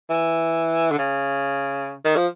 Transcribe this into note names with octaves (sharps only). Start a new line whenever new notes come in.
E3
D3
C#3
D#3
F3